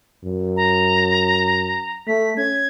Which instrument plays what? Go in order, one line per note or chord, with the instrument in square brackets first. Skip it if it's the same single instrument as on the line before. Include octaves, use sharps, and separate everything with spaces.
[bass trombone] F#2
[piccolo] A#5
[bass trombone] A3 [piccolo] B6
[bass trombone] C#4 [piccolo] G#6